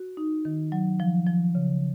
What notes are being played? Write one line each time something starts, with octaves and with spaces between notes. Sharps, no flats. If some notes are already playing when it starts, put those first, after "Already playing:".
Already playing: F#4
D#4
D#3
F#3
F3
F3
C#3